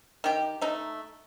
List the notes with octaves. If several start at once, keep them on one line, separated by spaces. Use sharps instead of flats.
D#3 G4
A3 D#4